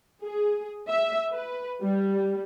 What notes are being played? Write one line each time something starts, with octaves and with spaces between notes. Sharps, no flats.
G#4
E5
B4
G3